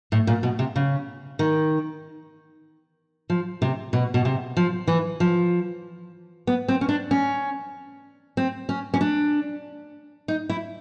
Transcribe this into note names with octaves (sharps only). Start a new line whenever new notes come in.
A2
A#2
B2
C3
C#3
D#3
F3
C3
B2
B2
C3
F3
E3
F3
B3
C4
C#4
D4
C#4
C4
C#4
C#4
D4
D#4
E4